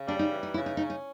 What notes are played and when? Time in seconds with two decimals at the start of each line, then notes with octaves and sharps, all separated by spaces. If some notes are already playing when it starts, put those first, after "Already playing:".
Already playing: C#3
0.08 G3 D4
0.19 D#4
0.31 E3
0.43 D#4
0.54 C#3 E4
0.66 D#4
0.77 C#4 D#4
0.90 D#4